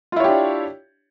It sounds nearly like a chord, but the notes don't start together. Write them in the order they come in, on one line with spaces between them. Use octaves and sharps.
F4 E4 C#5 G4 D4